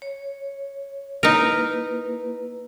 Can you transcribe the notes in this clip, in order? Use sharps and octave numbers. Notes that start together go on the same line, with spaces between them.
C#5
A#3 D#4 E4 A#4 B4